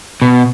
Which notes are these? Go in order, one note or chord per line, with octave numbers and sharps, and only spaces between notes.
B2